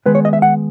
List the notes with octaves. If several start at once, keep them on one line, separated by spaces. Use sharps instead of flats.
D#3 G#3 B3 B4
C#5
D#5
E5
F#5